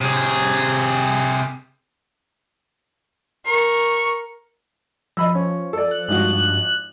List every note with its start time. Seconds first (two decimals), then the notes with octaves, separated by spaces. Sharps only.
0.01 C3 G#4
3.46 A#4 C#6
5.17 F3 D#5 B5 E6
5.35 C#4
5.73 A4 D5
5.91 F#6
6.08 G#1 G2 F3 F#4